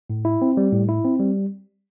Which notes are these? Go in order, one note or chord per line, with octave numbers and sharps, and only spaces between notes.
A2
E4
C4
G3
A2
E4
C4
G3